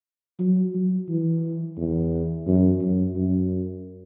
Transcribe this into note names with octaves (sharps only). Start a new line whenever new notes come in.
F#3
F#3
E3
E2
F#2
F#2
F#2